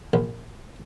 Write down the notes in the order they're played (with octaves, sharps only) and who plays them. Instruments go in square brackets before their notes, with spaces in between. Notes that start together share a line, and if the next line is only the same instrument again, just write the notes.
[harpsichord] A#1